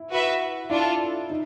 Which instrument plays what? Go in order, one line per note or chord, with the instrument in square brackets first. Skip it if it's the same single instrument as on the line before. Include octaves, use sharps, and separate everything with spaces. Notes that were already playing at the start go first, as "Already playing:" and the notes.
Already playing: [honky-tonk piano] E4
[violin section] F#4 B4 E5
[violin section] D4 F4 A4 [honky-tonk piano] E4
[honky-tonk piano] D#4